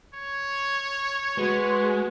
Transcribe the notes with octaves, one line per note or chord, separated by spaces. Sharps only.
C#5
G#3 F#4 B4